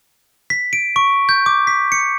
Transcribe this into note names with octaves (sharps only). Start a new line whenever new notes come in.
B6
D7
C#6
G6
D6
B6
C#7